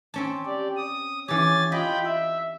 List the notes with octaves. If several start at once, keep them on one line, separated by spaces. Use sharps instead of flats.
C4 C#4 A5
G4 D5
D#6
E3 C#4 G4 G#5 A6
F4 D#5 G5 B5
E5